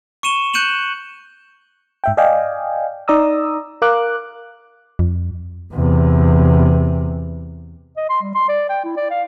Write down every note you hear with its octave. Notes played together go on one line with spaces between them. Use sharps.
C#6 C#7 D#7 E7 G7
F#6 G6 C#7 D#7 E7 F#7
G#2 E5 G5
D5 D#5 F5 G5 G#5
D#4 D5 A#5 D#6 E6
A#4 F5 D6 F#6
F2
E2 C3
D#5
C6
G3
C6
D5
G5
E4
D5
F5